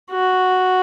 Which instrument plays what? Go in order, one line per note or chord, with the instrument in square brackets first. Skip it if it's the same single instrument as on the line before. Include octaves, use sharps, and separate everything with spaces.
[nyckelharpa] F#4